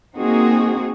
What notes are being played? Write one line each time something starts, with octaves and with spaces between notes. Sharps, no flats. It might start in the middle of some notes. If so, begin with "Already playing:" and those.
A#3 C4 D#4 F#4 G#4